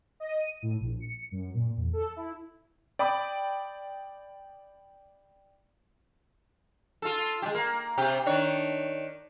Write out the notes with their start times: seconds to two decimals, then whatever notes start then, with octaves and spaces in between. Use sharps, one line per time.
0.20 D#5
0.41 D#7
0.62 A2
0.80 A#1
1.00 C#7
1.31 F#2
1.54 A#2
1.77 E2
1.93 A4
2.16 E4
2.99 D5 G5 B5 D6 D#6
7.02 F4 A4
7.42 G#3 G4
7.55 A#3
7.98 C3 G4
8.26 D#3 D4 C#5